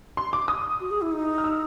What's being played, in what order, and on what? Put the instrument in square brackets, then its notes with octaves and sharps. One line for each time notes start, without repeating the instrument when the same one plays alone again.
[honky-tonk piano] C6
D6
D#6
[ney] F#4
G#4
E4
D#4
[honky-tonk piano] F6
E6